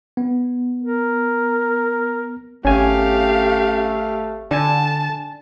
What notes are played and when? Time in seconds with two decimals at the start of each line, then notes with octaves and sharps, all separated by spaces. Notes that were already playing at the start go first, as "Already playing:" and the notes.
0.17 B3
0.82 A#4
2.65 G#1 A3 C#4 G4 F5 G#5
4.51 D3 D4 G#5 A5